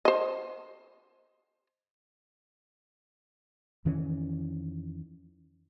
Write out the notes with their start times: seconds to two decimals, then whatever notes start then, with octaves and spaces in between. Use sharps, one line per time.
0.05 C5 D#5
3.85 F2 D#3 E3 C#4